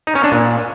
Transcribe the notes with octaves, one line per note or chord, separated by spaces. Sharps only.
D#4
C#4
D4
A#2